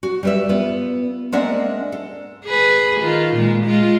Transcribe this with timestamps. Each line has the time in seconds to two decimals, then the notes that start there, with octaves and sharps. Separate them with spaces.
0.03 F#4
0.23 G3 B4 E5
0.49 B3 F4 B4
1.32 G#3 A#3 C4 D4 E5 F#5
1.92 A4
2.45 G#4 B4
3.01 D#3 F4
3.34 A#2 G#3
3.65 G#3 F4